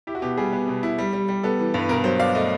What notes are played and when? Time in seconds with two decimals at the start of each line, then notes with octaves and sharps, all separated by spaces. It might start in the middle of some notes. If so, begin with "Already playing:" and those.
0.07 E4 G4
0.15 F#4
0.22 B2 G4
0.37 G3 G#4
0.53 B3
0.68 B2
0.83 E4
0.99 G3
1.13 G3
1.29 G3
1.43 B3 A4
1.59 E3
1.74 G2 B4
1.89 B2 A#4
2.04 F#3 C5
2.19 D4 F5
2.35 A3 D#5